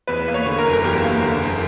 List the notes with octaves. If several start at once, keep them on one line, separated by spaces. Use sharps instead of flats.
E2 B4
A#3
C#5
D3
A#4
F#1
A#4
E2 G4
A#3
D3
F#1